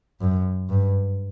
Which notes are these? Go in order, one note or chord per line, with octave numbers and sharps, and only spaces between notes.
F#2
G2